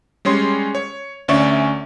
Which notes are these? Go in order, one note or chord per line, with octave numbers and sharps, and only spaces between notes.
G3 G#3 C#4 C#5 C6
C#5
D2 C#4 D5 E5 C#6